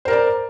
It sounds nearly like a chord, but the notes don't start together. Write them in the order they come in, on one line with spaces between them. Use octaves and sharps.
C5 A#4 D5 A#5